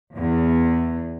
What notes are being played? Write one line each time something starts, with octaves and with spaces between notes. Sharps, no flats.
E2